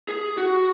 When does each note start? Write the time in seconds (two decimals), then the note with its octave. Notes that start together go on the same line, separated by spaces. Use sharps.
0.09 G#4
0.38 F#4